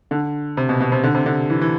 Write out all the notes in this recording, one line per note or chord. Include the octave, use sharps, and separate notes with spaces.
D3
C3
B2
B2
C3
D3
C3
D3
E3
E3